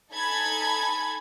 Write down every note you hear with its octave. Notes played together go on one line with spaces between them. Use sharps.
D#4 A4 G#5 A5 B5 G#6